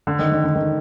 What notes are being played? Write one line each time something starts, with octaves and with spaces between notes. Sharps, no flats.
D3
D#3
D#3
D3
D#3